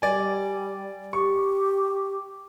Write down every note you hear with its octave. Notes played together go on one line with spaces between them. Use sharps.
G3 D5 G#5
G4 C#6